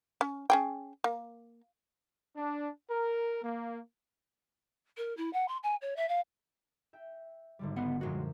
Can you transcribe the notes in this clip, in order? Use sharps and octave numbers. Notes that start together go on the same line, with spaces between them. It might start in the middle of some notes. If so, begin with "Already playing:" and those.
C#4
C#4 G#4 G5
A#3
D4
A#4
A#3
A#4
E4
F#5
C6
G#5
C#5
E5
F5
E5 G5
G#1 D3 G3
C#2 B3 F#5
F#2 A#2 F3 G#3 F#4